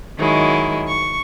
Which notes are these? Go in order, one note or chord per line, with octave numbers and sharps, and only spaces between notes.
D#3 F#3 G#3 E4
C#6